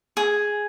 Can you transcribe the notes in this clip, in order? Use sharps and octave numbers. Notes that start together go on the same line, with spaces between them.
G#4